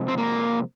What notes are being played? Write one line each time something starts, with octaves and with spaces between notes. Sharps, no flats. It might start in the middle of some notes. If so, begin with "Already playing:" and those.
Already playing: C3 F3 G#3
C4
A#3